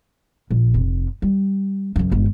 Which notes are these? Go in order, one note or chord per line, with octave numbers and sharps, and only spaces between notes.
A#1
F1
G3
F#2 C#3
G1 G#3